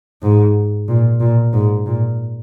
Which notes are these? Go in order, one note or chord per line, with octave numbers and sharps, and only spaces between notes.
G#2
A#2
A#2
G#2
A#2